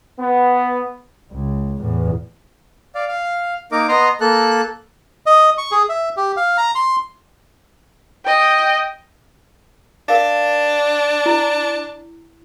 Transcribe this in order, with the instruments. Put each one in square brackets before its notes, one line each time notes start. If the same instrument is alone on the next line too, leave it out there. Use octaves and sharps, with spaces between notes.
[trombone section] B3
[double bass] C#2
E2 A2
[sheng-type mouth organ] D5 F5
F5
A#3 D#4 A#4 D6
B3 D#5 A#5 C6
A#3 A4 F#6
[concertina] D#5
C#6
G#4
E5
G4
F5
A#5
C6
[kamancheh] D#5 G5
[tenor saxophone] D4 [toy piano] A#4 F5 G5
[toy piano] E4